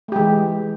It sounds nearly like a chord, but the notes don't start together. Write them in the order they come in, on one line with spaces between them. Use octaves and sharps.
A3 G4 G#3 E3